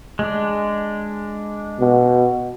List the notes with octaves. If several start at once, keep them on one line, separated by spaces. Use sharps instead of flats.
G#3 D4
B2